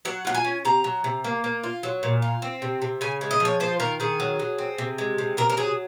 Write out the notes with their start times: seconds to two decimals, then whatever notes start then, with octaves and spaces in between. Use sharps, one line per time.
0.05 F#3 F#5
0.25 F4 F#5
0.34 G#5
0.45 C#4
0.65 C3 A#5
0.84 F#3
1.04 C3
1.24 A#3
1.44 A#3
1.64 F4
1.83 F#3
2.03 A#2
2.22 F4
2.42 C4
2.62 C3
2.82 C3
3.01 C#3 G#5
3.21 G#3
3.31 D#5
3.40 F3
3.45 C#5
3.60 F4 C5
3.80 D#3 A#4
4.00 D#3 G#4
4.20 F#3
4.39 F#3
4.58 C4
4.78 C3
4.98 G#3
5.18 C3
5.37 C3 A#4
5.50 A#4
5.57 F#3 G#4